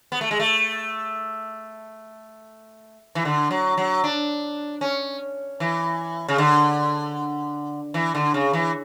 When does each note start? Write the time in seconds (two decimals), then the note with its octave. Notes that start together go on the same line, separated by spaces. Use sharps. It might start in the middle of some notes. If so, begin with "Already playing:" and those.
0.12 B3
0.21 A3
0.31 G#3
0.40 A3
3.15 E3
3.25 D3
3.51 F#3
3.77 F#3
4.04 D4
4.81 C#4
5.60 E3
6.28 C#3
6.38 D3
7.94 E3
8.15 D3
8.34 C#3
8.53 E3